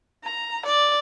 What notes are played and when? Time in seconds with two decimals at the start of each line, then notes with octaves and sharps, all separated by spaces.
0.24 A#5
0.66 D5